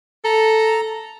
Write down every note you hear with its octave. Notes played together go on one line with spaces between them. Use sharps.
A4 A#5